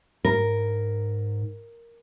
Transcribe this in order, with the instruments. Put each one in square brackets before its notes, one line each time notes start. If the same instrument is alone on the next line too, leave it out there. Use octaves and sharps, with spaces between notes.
[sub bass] G#2 [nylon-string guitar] A#4